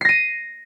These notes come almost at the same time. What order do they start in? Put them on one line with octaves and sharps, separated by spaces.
C7 A#6 D#7